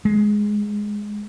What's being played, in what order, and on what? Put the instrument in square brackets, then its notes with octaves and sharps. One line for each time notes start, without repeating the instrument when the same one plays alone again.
[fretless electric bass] G#3